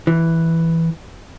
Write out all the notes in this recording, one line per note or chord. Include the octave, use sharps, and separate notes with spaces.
E3